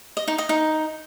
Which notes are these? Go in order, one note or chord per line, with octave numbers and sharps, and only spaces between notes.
D#5
D#4
D#5
D#4